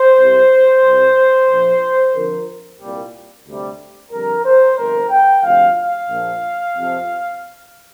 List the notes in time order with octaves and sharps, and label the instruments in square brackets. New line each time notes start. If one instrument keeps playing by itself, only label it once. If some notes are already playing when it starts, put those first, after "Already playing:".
Already playing: [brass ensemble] C5
C2 C3 G3
C2 C3 G3
A#1 A#2 F3
F2 D3 F3 A#4
C2 A#2 G3
D2 C3 G3
F2 D3 G3 A#4
C5
G1 F2 C3 A#4
G5
D2 C3 F3 F5
F5
A#1 A#2 F3
F2 C3 F3